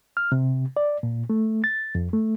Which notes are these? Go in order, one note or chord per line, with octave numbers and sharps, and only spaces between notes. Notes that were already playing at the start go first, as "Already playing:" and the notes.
F6
C3
D5
A#2
A3
A6
F2
A3